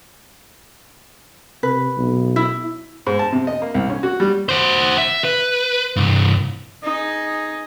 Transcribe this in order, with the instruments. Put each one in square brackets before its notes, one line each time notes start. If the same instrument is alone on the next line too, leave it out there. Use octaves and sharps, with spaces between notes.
[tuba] C3 [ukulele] B4
[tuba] B1
[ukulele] E4
[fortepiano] G#2
A5
C3
D#5
A#3
C2
C#4
F#4
G3
[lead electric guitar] F#4 C5
E5
B4
C2 G2
[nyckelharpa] D#4 G#4